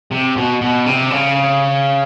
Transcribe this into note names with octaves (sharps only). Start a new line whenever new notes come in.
C3
B2
B2
C3
C#3